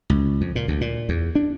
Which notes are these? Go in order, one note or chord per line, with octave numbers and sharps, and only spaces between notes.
C#2
F2
A#2
D2
A#2
E2
D4